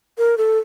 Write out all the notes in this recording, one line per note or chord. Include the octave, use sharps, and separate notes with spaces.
A#4
A4